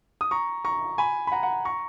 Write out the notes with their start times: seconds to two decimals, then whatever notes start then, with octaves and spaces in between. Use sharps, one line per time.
0.21 D#6
0.31 A#5 C#6
0.65 A#5 C#6
0.98 G#5 B5
1.27 B5
1.32 F#5 A#5
1.43 F#5 A#5
1.65 A#5 C#6